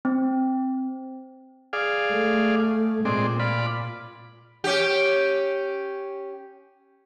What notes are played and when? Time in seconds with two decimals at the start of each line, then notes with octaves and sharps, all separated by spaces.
0.05 C4
1.73 G#4 D5 F5
2.13 A3
3.05 A#2 G#3 C4 D5
3.40 F4 D5 B5
4.64 C#4 G4